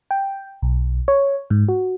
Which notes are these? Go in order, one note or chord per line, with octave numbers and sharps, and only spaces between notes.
G5
B1
C#5
G#2
F#4